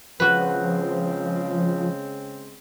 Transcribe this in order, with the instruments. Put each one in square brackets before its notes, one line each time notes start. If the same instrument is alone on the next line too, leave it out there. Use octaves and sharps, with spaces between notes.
[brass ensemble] C#3 G#3 C4 [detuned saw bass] F3 [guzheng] F#4 B4